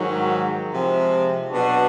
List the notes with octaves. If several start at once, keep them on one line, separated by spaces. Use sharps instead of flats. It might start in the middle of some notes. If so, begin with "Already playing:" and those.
Already playing: G#2 D#3 F#3
C3 F3 G#3
B2 F#3 B3 D4 F#4